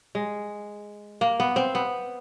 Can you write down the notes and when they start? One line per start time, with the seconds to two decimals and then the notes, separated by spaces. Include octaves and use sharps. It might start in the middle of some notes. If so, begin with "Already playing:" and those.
0.15 G#3
1.21 A#3
1.40 B3
1.56 C4
1.75 B3